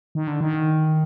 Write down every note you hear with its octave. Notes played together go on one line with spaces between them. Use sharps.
D#3
D3
D#3